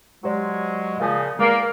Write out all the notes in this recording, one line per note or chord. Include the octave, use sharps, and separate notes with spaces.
F#3 G#3 G4 C5 D5
A#2 C#3 F3 F5 G#5 D#6
E2 G#3 A#3 D5 F5